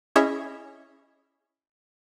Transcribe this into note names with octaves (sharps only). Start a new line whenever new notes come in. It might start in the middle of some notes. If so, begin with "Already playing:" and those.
C#4 E4 G#4 C#5 D#5 E5